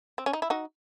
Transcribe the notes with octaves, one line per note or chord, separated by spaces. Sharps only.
C4
C#4
D#4
E4
D#4 F#4